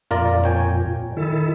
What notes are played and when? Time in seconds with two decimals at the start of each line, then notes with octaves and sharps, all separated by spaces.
0.11 F2 A#2 F4 A#4 D5
0.44 C#5 G5 G#5
1.17 D#3 E4 A4